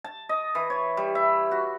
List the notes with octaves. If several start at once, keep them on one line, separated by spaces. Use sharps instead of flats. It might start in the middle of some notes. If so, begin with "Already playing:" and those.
A5
D#5
E3
C#5
G3
E5
F#4